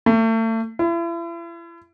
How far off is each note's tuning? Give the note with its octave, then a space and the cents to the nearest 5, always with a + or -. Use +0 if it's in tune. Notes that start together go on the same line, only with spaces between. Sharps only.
A3 +35
E4 +40